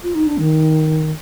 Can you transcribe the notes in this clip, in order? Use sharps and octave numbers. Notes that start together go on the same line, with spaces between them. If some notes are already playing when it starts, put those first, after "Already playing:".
F4
D#4
D4
D#3